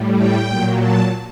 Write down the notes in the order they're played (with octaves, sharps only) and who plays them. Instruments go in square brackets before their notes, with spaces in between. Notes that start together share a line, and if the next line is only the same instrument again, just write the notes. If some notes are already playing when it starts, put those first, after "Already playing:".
Already playing: [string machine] A2 G3
G5
A#2 F#3
A5